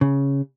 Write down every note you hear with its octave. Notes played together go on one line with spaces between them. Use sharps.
C#3